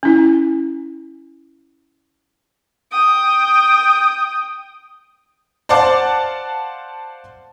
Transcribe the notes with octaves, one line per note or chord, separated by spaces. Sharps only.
C#4 E4
G5 D#6
C5 D5 F5 F#5 A5 D6